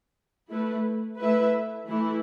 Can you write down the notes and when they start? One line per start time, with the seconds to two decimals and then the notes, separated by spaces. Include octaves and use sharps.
0.50 A3 E4 B4
1.20 A3 E4 B4 E5
1.89 E3 A3 E4